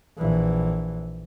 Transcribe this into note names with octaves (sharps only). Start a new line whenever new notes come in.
A#1 E3